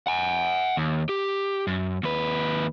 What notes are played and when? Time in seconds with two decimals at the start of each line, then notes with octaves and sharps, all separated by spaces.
0.07 F#5 G#5
0.77 D#2
1.09 G4
1.67 F#2
2.03 D#2 B4